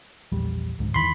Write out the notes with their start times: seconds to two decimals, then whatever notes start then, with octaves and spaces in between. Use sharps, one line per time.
0.32 A#1 E2 G3
0.79 C#2 G#2 D3
0.94 E2 D#3 E3 B5 C6